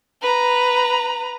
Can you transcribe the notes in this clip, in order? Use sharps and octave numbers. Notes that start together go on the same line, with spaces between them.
B4 A#5